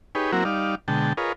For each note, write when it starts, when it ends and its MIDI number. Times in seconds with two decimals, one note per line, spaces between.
0.15 0.32 63
0.15 0.32 67
0.15 0.32 68
0.15 0.32 71
0.15 0.32 73
0.32 0.44 54
0.32 0.44 58
0.32 0.44 60
0.32 0.44 64
0.32 0.44 66
0.32 0.44 70
0.45 0.75 55
0.45 0.75 63
0.45 0.75 74
0.45 0.75 77
0.88 1.13 47
0.88 1.13 50
0.88 1.13 56
0.88 1.13 79
0.88 1.13 81
1.17 1.33 65
1.17 1.33 68
1.17 1.33 70
1.17 1.33 71
1.17 1.33 73
1.17 1.33 75